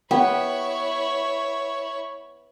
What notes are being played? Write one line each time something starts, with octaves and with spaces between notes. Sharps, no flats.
B3 E4 G4 C#5